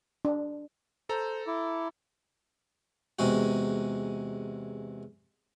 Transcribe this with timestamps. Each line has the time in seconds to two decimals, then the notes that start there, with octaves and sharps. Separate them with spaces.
0.25 D4
1.09 A4 C5 A#5
1.47 E4 D6
3.19 E2 C3 G#3 F#4